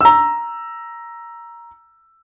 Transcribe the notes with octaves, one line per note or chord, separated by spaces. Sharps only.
A#5 E6